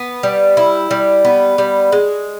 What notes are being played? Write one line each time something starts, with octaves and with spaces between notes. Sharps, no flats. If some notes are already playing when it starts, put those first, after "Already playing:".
Already playing: B3
G3
E4
G3
B3
G3
G#3